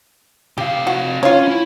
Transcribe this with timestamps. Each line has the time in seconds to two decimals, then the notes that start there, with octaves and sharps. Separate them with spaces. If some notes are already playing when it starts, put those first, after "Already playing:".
0.58 C3 G4 F5
0.87 F#4
1.23 C#4 F4 C#5
1.48 E4